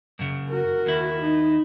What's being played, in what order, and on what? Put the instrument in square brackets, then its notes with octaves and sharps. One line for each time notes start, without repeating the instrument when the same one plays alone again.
[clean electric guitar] F#2 C#3
[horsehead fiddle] F#4 A#4
[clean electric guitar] D#2 E4
[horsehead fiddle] D#4